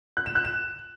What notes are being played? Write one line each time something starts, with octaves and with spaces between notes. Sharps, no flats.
F#6
E7
F#6
E7